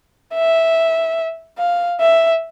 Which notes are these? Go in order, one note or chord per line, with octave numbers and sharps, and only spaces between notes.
E5
F5
E5